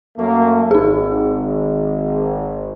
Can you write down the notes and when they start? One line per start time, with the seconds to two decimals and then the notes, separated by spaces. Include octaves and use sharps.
0.17 F#2 A3 A#3
0.71 G#1 D#4 G#4